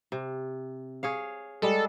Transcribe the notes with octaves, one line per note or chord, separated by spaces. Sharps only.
C3
G#4 C#5 F5
G3 G#3 A4